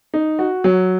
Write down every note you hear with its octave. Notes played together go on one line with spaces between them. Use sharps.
D#4
F#4
F#3